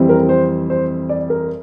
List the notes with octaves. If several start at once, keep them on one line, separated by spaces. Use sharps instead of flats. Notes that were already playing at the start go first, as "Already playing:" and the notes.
Already playing: F2 E3 G3 C4
A#4
C5
C5
D5
A#4